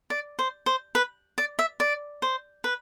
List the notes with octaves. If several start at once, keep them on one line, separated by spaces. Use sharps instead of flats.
D5
C5
C5
B4
D5
E5
D5
C5
B4